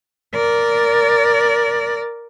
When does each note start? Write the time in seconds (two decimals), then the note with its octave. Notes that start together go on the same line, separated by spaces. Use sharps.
0.34 A#4 D5